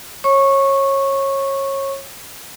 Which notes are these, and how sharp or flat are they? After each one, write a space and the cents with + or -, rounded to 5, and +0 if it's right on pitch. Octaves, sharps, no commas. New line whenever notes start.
C#5 -25 C#6 -10